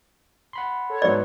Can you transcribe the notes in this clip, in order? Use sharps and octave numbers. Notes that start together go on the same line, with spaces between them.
F#5 B5 C6
A4 C#5
G#2 F#3 B3 D5